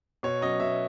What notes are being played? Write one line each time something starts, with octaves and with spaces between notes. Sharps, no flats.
B2 C#5
F#3 C#4 D#5
B2 E5